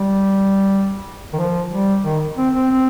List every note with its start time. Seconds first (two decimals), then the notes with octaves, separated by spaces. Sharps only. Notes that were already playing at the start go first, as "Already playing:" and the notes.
Already playing: G3
1.33 D#3
1.38 F3
1.71 G3
2.05 D#3
2.37 C4
2.55 C4
2.71 C4